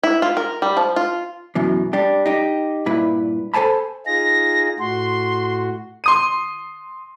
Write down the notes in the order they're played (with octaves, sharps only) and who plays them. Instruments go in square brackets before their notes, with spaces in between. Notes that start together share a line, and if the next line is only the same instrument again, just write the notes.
[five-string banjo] E4
F4
A#4
G3
F3
F4
[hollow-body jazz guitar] F#2 B2 E3
G3 D4 G4
D#4 G4
G2 A#2 E4 B4
A4 C5 G#5 A5 B5
[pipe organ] D#4 F4 G#4 [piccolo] A#6
[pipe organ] A2 F#4 [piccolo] C6
[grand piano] C6 D#6 D#7